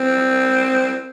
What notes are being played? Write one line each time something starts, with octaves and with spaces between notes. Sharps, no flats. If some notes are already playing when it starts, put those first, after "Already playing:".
Already playing: C4